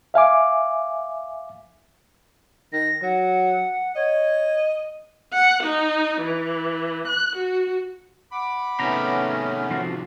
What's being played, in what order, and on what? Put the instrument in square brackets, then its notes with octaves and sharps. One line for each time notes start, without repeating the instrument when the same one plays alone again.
[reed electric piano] E5 F5 G#5 D6
[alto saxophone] D#3 [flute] A#6
[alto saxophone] F#3 [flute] F#5
[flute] C#5 [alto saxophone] D#5
[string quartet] F#5
D#4
E3
F#6
F#4
[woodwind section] F#5 B5 D6
[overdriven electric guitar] C3 D#3 [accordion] A3 B3 C#4 [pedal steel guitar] A#5
[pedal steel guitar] F3 C4 F#4